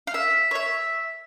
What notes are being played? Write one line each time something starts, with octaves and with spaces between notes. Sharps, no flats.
F5
E5
C#5
E5